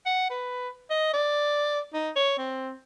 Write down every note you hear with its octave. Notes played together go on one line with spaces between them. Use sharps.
F#5
B4
D#5
D5
D#4
C#5
C4